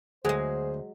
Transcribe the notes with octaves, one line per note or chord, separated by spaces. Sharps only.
D2 F#3 G#3 G#4 C5